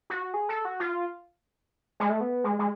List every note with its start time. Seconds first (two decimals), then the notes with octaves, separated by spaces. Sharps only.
0.10 F#4
0.34 G#4
0.49 A4
0.65 F#4
0.80 F4
2.00 G#3
2.10 A3
2.21 B3
2.44 G#3
2.59 G#3